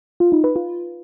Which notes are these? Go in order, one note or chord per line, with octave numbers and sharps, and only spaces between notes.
F4
D#4
B4
F4